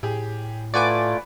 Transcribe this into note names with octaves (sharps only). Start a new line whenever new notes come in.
A2 G4 G#4
A3 F4 B4 D5 F#5 G#5 C#6 D6